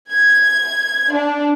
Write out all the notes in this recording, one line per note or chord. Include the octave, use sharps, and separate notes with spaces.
G#6
D4